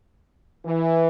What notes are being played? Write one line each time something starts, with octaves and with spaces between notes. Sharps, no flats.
E3